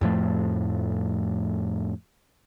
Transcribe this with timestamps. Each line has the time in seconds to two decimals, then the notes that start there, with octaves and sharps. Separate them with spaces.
0.01 F2 A2 F3 A3